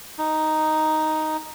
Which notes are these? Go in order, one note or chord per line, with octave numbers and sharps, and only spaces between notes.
D#4